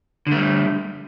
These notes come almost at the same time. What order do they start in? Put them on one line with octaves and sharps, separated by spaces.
D3 A3 G3